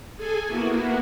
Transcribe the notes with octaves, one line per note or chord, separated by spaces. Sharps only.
G#4 A4 G#5
A#3 B3 E4 F#4